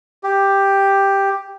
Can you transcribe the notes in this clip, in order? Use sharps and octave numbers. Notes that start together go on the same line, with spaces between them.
G4